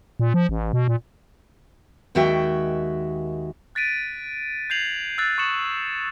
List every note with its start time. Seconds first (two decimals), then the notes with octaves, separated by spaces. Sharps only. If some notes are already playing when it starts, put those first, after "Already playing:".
0.20 A#2
0.34 F3
0.49 A1
0.73 B2
0.88 A#2
2.15 D#2 D#3 G#3 F#4 E5 G5
3.75 F#6 A6 B6 D7 D#7
4.70 G6 G#6 C7 F7 F#7
5.18 E6 F#6 A6
5.38 C#6 D#6 C#7 E7 F#7